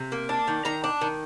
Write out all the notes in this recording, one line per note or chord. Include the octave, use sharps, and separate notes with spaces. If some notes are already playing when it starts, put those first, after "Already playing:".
Already playing: C3
A#3
D4
D#3
D#3 A#5
D4
D#3